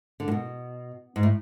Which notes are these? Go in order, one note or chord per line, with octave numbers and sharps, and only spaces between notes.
D3
A2
B2
G#2
A2